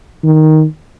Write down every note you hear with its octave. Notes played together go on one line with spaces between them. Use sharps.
D#3